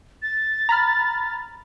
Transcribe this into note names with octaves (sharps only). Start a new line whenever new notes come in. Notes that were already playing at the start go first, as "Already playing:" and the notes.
A6
A#5 B5 F6